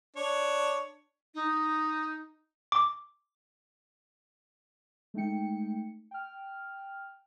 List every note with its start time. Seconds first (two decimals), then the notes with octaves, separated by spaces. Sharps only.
0.16 D4 C#5
1.34 D#4
2.72 D6
5.14 G#3 A3 D#4 G5 C#7
6.11 G5 F6